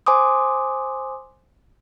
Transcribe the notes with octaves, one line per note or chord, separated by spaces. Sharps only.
C5 G#5 C6 D6 D#6